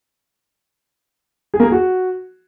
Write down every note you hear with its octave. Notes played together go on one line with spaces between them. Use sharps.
G#4
A#3
G#4
F#4